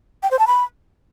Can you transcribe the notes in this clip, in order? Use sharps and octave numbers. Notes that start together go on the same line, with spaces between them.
G5
C5
A5
B5